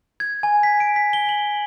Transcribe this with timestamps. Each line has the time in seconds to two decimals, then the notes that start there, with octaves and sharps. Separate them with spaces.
0.20 G#6
0.43 G#5
0.63 B6
0.80 D7
0.96 B6
1.13 G7
1.29 F#7